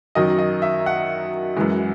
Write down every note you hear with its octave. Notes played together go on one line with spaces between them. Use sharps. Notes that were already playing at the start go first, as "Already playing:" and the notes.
F#2 D#3 F#3 D#5
D#5
E5
F#5
F#2 E3 G#3